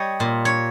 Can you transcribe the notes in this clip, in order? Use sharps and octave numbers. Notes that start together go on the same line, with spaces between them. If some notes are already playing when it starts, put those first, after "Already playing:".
Already playing: G3 C#5 D#5
A#2
C#5